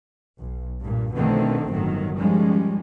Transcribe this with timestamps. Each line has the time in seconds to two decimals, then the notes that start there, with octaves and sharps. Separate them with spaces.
0.39 B1
0.82 G2 A#2
1.16 B2 D3 D#3 F3 A3 C4
1.71 G1 A2 D#3 F#3
2.19 D#3 F3 G3 G#3 C#4